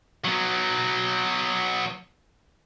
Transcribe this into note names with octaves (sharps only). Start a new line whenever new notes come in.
F#3 B3